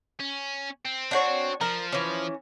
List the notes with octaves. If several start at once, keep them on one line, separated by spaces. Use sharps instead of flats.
C#4
C4
D4 F#4 C#5
F3 A#4
E3 C#4